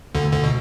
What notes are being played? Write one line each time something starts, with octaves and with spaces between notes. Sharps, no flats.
D2 D3
D2 D3
B2